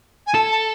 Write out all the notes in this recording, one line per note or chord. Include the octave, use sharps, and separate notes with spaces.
G#5
A4 A5
A5